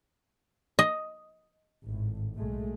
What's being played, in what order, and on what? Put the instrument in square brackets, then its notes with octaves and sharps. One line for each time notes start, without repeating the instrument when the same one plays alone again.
[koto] D#5
[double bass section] G#1 A2
B1 G#3 A3